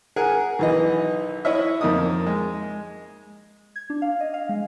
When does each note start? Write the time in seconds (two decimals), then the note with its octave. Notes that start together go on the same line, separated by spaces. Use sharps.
0.16 G#4 A#4 F#5 G#5
0.59 B1 E3 D#5
1.45 E4 C#5 D#5 E5
1.81 F2 A#3 D#4 D#6
2.26 G#3
3.76 G#6
3.90 D4
4.02 F5
4.21 D#5
4.34 F5
4.49 G#3